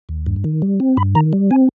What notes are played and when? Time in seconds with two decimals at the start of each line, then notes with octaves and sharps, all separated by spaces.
0.09 D#2
0.26 G2
0.44 D#3
0.62 G3
0.80 C4
0.97 G2 B5
1.15 D#3 A#5
1.33 G3
1.51 C4 G#5